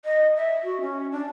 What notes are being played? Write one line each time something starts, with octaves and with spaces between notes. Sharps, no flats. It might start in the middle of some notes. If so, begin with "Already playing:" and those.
D#5
E5
F#4
C#4
D4